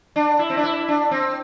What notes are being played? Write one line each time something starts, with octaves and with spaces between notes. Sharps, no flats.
D4
E4
C4
D4
E4
D4
C4